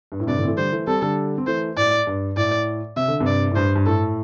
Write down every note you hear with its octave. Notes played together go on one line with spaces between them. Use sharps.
G2
A2
G2 C3 D5
A2 D3
C4
E3 A3
D3 G3 C5
E3 A3
G3 C4 A4
D3 G3
C4
E3 A3 C5
A2 D5
G2
A2 D5
C3 E5
D3
G2 C3
D5
A2
G2 C5
G2
A2 A4